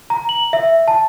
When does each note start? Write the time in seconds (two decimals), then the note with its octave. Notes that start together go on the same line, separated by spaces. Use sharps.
0.10 A#5
0.29 F#7
0.53 E5
0.88 A5